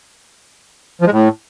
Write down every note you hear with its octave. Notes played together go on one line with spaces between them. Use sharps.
F3
G#3
A2